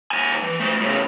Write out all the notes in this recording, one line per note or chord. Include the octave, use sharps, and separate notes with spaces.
D#2 G#5
E3
A3 C5
A2 C#3